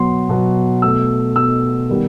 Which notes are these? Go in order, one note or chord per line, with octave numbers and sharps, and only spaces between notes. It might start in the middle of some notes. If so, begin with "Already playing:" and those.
Already playing: B2 F#3 B3 C6
B2 F#3 B3
B2 A3 E6
B2 A3 E6
D#3 G3 B3